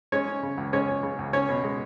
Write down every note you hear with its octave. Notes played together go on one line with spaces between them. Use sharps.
G#3 C#4 C#5
C#4
C#3
C#2
G#3 C#4 C#5
C#4
C#3
C#2
C#4 C#5
B2
G#3